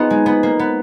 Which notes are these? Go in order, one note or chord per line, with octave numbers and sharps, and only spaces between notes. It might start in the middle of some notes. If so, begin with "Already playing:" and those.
Already playing: B3 D#4 F4 G#4
G#3
B3
A#3
B3